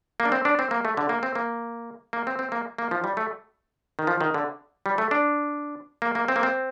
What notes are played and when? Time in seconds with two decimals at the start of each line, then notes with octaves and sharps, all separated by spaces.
0.20 A#3
0.25 D4
0.32 C4
0.45 D4
0.59 C4
0.71 A#3
0.85 A3
0.97 D3
1.09 A#3
1.23 C4
1.35 A#3
2.13 A#3
2.27 C4
2.39 C4
2.52 A#3
2.78 A#3
2.91 F3
3.04 G3
3.17 A3
3.99 D#3
4.07 F3
4.21 D#3
4.34 D3
4.86 G3
4.98 A3
5.11 D4
6.02 A#3
6.15 A#3
6.28 C4
6.36 A#3
6.43 C4